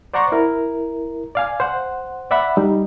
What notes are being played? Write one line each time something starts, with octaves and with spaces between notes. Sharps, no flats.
C5 D5 F#5 A#5 C6 C#6
E4 A#4
D5 F5 G#5
C5 F#5
D5 E5 F#5 B5
G3 D#4